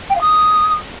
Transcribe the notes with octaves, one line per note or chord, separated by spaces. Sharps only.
G5
F5
D#6